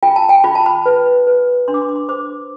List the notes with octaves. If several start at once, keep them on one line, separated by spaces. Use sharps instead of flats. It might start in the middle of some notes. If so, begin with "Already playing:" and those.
F4 G5
A5
G5
F4 B5
A5
B5
B4
B4
D4 C6
D6
C6
D6
C6
C5 D6